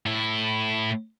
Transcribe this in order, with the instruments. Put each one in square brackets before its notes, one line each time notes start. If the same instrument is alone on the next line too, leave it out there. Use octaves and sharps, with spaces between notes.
[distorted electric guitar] A2 E4